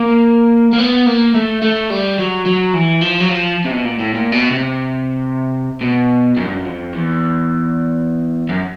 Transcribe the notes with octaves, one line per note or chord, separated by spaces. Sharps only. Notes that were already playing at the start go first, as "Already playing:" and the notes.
Already playing: A#3
A#3
B3
A#3
A3
A3
G3
F#3
F#3
E3
F3
F#3
F3
C3
B2
A#2
A2
A#2
B2
C3
B2
F#2
G2
F#2
F2
E2
F#2